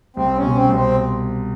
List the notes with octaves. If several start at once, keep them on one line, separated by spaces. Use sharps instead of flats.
C2 C4
C#4
B2
C4
C2
C4